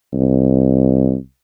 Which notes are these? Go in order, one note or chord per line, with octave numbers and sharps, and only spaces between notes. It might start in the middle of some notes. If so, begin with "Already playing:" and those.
C2